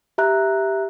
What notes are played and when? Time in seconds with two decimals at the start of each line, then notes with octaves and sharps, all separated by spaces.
0.18 G4 E5 A#5 F#6